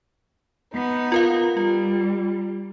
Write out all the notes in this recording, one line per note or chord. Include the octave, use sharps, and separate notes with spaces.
B3 D#4
F4 A#4 F5
G3 F4